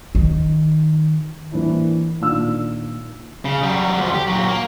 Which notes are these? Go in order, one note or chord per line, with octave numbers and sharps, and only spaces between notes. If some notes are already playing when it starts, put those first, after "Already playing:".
D#3
E3 A#3 C4 D4 E4
A#2 D#3 D4 F5 E6 F6
C#3
F#3 G3
D2 F3
G4
A#2 F#3
A#3